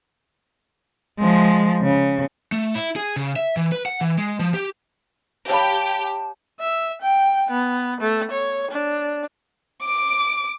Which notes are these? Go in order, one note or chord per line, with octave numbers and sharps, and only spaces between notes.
F3 G#3
C#3
A3
E4
G#4
C#3
E5
E3
B4
F#5
E3
G#3
F3
G4
G4 C#5 F5 G5 A5 B5
E5
G5
B3
A3
C#5
D4
D6 D7